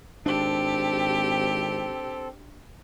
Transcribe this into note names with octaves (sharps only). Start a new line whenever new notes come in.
G#1 C4 D4 G4 A4